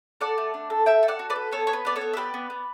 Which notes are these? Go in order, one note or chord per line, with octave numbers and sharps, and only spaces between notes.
A4 D5 F#5
A3
D4
A4
A4 E5 G5
A4
D5 F#5
F#4
B4 D5
A4
B3 A4 C#5
B3 C#5
B4
B3 D5
A4 C#5
B3
E5
G4 B4 D5
B3
B3